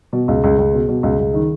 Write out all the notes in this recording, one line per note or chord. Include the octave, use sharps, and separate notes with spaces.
B2
C#2
C#2
C#2
B2
B2
C#2
C#2
D#3